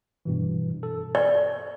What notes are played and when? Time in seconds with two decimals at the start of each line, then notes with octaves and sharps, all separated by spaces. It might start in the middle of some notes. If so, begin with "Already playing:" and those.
0.25 G2 B2 E3
0.83 A4
1.15 D5